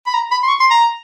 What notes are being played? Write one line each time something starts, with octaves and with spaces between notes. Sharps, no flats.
B5
A#5
B5
C6
C#6
C6
A#5